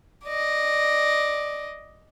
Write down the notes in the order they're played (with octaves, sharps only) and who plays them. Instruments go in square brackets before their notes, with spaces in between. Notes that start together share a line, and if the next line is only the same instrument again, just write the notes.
[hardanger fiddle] D5 D#5